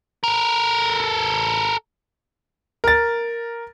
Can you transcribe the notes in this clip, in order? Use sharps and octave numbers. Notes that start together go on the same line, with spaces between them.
A4 A#4
A#4 A6